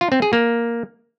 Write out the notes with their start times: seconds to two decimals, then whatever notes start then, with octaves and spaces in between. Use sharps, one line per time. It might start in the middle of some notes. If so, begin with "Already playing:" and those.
0.01 F4
0.12 C4
0.22 G#4
0.33 A#3